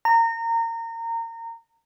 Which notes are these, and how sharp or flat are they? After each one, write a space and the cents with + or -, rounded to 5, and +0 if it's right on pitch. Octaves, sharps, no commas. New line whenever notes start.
A#5 -25